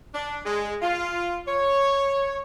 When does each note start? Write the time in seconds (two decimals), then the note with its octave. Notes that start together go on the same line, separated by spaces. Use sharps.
0.14 D4
0.45 G#3
0.82 F4
1.46 C#5